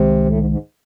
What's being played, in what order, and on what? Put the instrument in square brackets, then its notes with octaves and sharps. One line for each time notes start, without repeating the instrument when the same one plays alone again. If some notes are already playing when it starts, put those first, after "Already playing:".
Already playing: [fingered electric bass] C2 D#3 G#3 [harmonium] C3
[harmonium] A2
G#2
G#2